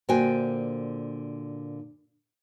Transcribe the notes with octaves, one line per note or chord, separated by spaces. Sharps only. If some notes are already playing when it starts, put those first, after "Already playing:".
A#2 D3 F#4 C5 G5 G#5